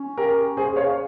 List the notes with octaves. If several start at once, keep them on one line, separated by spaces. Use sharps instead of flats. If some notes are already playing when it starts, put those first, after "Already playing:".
Already playing: C#4
G4 A#4
G#4 C5
C#5 F5